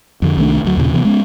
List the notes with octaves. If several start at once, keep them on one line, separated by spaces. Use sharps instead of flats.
F2 D3
C2 D#3 A3 D4
D2 F#3
D#2 A#2 C#3
C3 E3 B3
G#3 B3 C#4